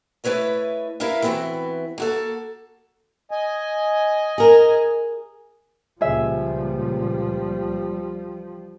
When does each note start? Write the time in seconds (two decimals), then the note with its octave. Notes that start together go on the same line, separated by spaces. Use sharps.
0.24 A3 E4 B4 C#5 D#5
1.00 E4 A#4 B4 E5 F5
1.22 E3 B3 C4 E4 F#4
1.98 A#3 F#4 A4
3.31 D#5 G#5
4.38 G#4 A#4
6.01 C#2 A#2 F3 G3 G#4 E5